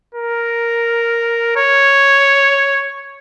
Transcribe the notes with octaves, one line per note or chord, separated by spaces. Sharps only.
A#4
C#5